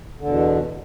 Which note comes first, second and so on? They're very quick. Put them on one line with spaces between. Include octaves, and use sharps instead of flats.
D3 E2 B2